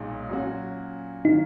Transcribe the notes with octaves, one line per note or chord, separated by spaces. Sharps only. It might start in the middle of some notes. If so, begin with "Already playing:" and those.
Already playing: B1 A#2 G#3 D#4
A#2 F#3 C#4 F#4
D#3 F#3 A#3 D#4